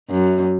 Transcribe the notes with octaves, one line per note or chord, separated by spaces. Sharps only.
F#2